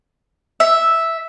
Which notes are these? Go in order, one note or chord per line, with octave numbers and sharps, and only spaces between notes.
E5